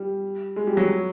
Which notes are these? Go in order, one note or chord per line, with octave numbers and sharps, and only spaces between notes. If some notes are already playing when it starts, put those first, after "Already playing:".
Already playing: G3
G#3
G3
F#3